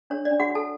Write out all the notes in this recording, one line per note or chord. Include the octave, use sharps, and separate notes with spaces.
D4 C#5
D5
D4
F#4 F#5
F#4
A4 A5